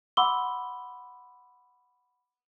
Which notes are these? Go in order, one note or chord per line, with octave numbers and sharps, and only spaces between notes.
F#5 B5 C6 D6 E6 G7